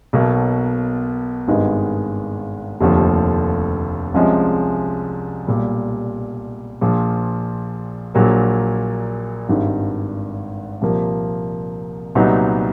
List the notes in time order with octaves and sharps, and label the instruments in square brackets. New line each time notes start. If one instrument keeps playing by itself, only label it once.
[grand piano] B1 B2 F#3 A#3
G#1 G2 D#3 G#3 B3
F1 D#2 D3 F3 A3
C2 C3 F3 G#3 C#4
B1 A#2 G3
A#1 A#2 F3
A#1 A#2 F#3 A#3
G#1 G2 D#3
C2 A#2 F3 A#3
C2 A#2 F#3 B3 D#4